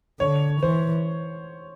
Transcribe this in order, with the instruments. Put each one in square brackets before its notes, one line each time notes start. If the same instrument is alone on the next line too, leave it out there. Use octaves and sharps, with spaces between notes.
[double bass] D3 [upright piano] C#5
[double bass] E3 [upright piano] C5